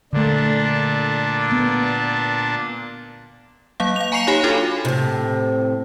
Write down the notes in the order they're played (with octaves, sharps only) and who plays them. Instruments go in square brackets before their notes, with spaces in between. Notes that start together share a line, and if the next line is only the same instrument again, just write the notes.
[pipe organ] A#2 D4 [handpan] D3 A3
[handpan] B3
[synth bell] F#3 A#3 F5
F5 F7
G#5 A#5 C#6 C7 C#7 F7
D#4 G4 C#5 F5 G#5 B5
D4 F4 F#4 A4
[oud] A2 C3